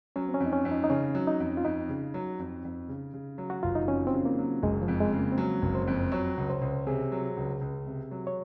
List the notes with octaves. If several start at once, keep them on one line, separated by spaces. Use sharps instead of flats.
F#3 C#4
C4
C#4
F2
D#4
C#4
F2
D#4
D#4
C#3 C#4
F#3
D#4
F2
F4
F2 D#4
C#3
F#3
F2
F2
C#3
C#3
F#3
F#4
F#1 F4
D#4
F2 C#4
C4
C#3
A#3
F#3
F#1 G#3
F3
F2
G#3
C#3
A#3
C4
F#3 C#4
F#1
C5
F2
F#3 C#5
C#2
C5
C#2
C3 G#4
F#3
C#2
C#2
C3
F#3
C#5